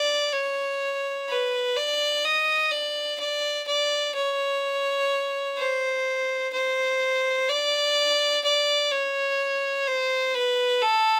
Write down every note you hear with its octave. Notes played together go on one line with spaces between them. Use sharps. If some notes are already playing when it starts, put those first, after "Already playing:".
Already playing: D5
C#5
B4
D5
D#5
D5
D5
D5
C#5
C5
C5
D5
D5
C#5
C5
B4
A4